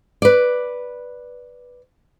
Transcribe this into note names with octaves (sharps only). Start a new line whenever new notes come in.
B4 D5